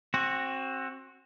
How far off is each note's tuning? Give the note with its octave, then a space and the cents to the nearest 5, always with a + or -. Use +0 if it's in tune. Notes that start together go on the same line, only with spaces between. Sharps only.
C4 +25 F#4 +0